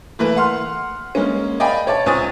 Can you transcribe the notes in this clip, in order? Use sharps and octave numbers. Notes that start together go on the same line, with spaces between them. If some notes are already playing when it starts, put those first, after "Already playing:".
E3 A3 A#3 B4
F#5 C6 F6
G#3 A#3 C#4
D5 D#5 F5 G5 G#5 B5
C#5 D5 A5 A6
C#2 C4 G#5 C#6 D#6 A6